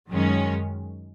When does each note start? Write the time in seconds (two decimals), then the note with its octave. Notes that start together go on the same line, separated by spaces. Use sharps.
0.10 F#2 D#3 G#3 C#4